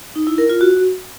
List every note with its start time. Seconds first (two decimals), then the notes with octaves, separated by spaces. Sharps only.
0.16 D#4
0.27 E4
0.38 A#4
0.50 F4
0.61 F#4